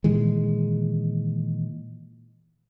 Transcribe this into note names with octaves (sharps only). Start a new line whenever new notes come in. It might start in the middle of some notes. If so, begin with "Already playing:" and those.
A#2 D#3 E3 G#3